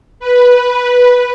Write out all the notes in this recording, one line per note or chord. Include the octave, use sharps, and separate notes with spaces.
B4